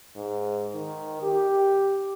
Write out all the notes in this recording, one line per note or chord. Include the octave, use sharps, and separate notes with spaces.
G#2
D#3
G4